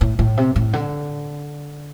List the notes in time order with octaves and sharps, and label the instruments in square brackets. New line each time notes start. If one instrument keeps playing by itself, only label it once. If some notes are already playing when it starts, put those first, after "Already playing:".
[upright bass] A2
A2
C3
A2
D3